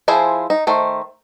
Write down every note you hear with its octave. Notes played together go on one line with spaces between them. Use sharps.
F3 E4 G#4 C5
D#4
D#3 A3 C5